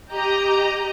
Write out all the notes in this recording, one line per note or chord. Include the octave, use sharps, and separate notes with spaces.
G4 D#5 A#5